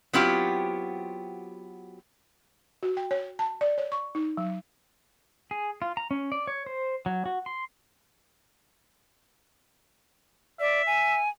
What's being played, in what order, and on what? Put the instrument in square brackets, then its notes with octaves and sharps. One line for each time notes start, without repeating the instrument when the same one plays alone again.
[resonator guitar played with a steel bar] F#3 B3 C4 E4 F4 G4
[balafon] F#4
G5
C#5
A5
D5
C#5
C#6
D#4
F#3
[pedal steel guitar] G#4
F4
A#5
C#4
D5
C#5
C5
F#3
F#4
C6
[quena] D5 [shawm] E5
[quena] G#5